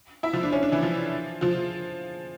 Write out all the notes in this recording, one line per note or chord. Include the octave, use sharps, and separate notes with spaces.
E4 E5
F3 F4
D4
C#4
D4
E3 E4
F3 F4
F3 F4